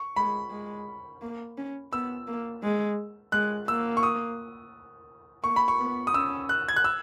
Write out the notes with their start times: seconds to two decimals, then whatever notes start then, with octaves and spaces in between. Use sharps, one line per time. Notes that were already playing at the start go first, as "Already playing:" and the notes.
Already playing: C#6
0.16 G#3 B5
0.51 G#3
1.22 A#3
1.58 C#4
1.92 B3 E6
2.28 A#3
2.63 G#3
3.32 G#3 F#6
3.68 A#3 E6
3.97 C#6
4.03 D#6
5.43 A#3 C#6
5.56 B5
5.68 C#6
5.79 B3
6.07 D#6
6.14 C#4 E6
6.49 F#6
6.68 G#6
6.76 F#6
6.84 E6